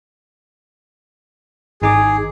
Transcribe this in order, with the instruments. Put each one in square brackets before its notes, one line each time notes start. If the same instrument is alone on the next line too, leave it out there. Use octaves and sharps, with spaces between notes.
[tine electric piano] G#1 D#4 D6 [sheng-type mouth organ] G#4